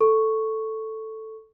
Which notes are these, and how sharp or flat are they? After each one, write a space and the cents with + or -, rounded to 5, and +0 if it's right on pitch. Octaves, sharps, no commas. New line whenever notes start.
A4 +0 C#6 +0